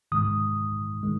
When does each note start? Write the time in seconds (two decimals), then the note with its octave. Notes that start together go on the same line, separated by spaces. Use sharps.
0.12 G#2 D#3 G#3 D#6
1.03 D#3 G#3